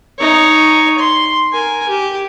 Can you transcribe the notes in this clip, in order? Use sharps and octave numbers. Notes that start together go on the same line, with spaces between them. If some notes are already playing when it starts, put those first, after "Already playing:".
D#4 C#5
C6
A#4 G#5
G4